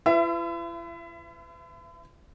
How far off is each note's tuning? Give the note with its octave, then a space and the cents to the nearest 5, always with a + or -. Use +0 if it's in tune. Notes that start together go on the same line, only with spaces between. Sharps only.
E4 +45 B4 +30 E5 +25